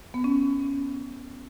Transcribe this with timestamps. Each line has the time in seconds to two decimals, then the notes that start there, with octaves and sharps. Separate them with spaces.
0.14 B3
0.24 C#4